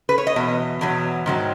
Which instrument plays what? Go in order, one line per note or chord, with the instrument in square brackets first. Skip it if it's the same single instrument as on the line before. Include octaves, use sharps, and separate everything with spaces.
[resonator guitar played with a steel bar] B4
C#5
D#5
E2 B2
E2 B2 F#3
G#2 D#3 F#3